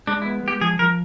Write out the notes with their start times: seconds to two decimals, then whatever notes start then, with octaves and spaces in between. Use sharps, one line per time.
0.07 G#3 D4
0.22 E4
0.25 B3
0.43 G#3 G4
0.61 F3 G#4
0.79 F3 A#4